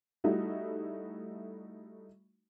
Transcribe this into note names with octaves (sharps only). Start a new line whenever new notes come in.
G3 A3 D#4 E4 F#4